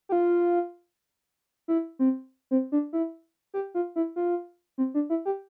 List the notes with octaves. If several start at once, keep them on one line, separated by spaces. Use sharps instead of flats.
G4
F4
E4
C4
C4
D4
E4
G4
F4
E4
F4
C4
D4
E4
G4